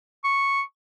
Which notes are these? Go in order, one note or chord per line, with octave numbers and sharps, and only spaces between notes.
C#6